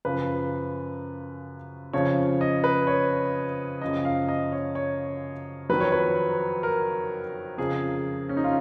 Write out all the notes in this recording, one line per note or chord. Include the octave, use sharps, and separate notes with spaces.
F#2 C#3 F3 B4
F2 C#3 F3 C#5
D#5
B4
C#5
F#2 C#3 F3 D#5
F5
D#5
C#5
C#5
F2 D#3 F#3 B4
C#5
B4
A#4
F2 C#3 F3 G#4
C#4
D#4
F4